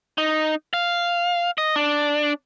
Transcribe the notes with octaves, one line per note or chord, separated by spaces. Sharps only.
D#4
F5
D#5
D4